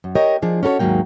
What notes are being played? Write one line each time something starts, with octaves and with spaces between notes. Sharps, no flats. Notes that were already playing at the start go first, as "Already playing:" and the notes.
F#2
G4 A#4 C#5 D#5 G5
F3 D4 G#4
C#4 F#4 A4 A#4 C#5
D#2 G#2 C#3 F#3 A#3 G5